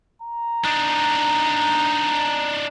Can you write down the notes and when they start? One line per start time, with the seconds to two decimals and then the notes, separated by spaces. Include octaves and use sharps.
0.22 A#5
0.64 D4 D#4